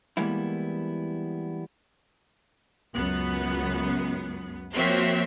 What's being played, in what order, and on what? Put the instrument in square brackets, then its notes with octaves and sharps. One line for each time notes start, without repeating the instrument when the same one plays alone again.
[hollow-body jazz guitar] E3 G3 G#3 A#3 B3 E4
[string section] C#2 F#2 B3
F3 A#3 C4 F#4 C#5 E5